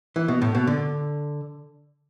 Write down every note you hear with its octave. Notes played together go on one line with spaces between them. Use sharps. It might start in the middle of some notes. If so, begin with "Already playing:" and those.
E3
B2
A2
B2
D3